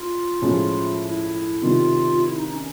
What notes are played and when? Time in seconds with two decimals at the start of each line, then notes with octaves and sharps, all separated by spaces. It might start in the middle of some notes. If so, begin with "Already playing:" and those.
Already playing: F4
0.41 A2 F3 G#3 C#4 E4
1.02 E4
1.62 C3 D#3 G3 F4
2.21 E4
2.36 D#4
2.51 C#4